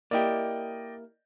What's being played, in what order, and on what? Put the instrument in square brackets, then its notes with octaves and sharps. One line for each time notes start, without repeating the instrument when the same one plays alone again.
[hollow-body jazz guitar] A#3 E4 G4 [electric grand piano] D5 D#5 G5